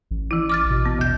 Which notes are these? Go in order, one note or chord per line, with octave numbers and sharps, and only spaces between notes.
A1
E3 E4
D6 F6 A6
B2
B3
D#2 G6